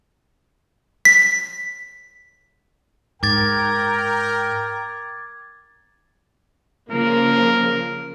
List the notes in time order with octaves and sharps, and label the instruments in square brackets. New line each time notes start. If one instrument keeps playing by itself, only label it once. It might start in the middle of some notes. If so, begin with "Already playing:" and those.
[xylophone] B6
[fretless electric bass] G#2 [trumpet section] A#4 G5 [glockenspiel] D6 G#6 A6
[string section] C#3 F3 A#3 [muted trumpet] A#4